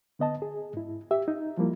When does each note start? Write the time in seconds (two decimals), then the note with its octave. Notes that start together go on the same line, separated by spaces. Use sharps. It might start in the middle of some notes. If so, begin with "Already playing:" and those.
0.19 D3 B3 D#5 A5
0.42 G#4
0.73 G#2 E4
1.11 G4 E5
1.28 D#4
1.57 F3 G3 A#3 E4